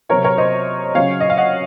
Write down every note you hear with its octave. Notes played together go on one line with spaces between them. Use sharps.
C3 F#3 C4 A#4 C#5
A#4 C#5
C5 D#5
C#3 F#3 C#4 C#5 F5
D#5
F5
D#5 F#5